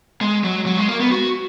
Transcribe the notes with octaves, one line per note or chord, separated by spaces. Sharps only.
G#3
F#3
F#3
G#3
A#3
B3
F#4